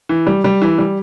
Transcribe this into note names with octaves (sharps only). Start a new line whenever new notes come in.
E3
G3
G3
E3
G3